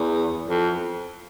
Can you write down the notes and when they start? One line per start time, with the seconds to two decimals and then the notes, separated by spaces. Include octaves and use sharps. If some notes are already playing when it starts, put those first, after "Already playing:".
Already playing: E2
0.48 F2